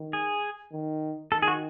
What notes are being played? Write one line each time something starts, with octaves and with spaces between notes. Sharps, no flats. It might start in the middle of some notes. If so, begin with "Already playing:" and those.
Already playing: D#3
G#4
D#3
D#3 A4
G#4
F#4